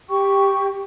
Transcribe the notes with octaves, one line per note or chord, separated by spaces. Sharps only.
G4 G5 C#6